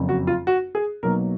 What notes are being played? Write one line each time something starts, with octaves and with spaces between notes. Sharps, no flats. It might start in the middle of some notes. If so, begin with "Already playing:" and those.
Already playing: F#1 F2 C#3
F#4
F4
F#4
G#4
B1 B2 F#3 A#3 A#4